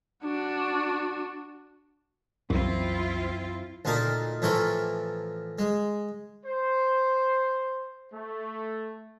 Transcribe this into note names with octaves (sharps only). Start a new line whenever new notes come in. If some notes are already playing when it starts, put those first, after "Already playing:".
D4 F#4
C2 F#2 E3 C4 E4 F4
D2 A#2 D#4 A#4 A5
A2 E3 F3 A4 A#4 C#6
G#3
C5
A3